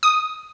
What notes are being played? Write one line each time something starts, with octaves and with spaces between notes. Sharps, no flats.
D#6